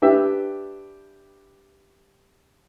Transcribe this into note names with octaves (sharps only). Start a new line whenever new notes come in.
D4 G4 B4 E5 G5